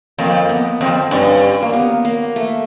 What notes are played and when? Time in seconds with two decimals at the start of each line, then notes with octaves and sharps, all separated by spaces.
0.18 F2 A#3
0.49 B3
0.81 F2 C4
1.11 G2 C#4
1.62 A#3
1.73 B3
2.05 A#3
2.36 A3